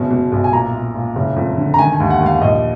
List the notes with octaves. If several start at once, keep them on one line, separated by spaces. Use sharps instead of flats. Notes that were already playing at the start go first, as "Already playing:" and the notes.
Already playing: F#1 B2
B2
B1
G#5
A#2 A#5
A#2
A#2
F#1
F2
D3
A#5
D#3 G#5
G#5
D#2
F#5
D#2
F5
A#1 D#5